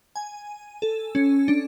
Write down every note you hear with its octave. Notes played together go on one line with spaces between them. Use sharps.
G#5
A4
C#4
D4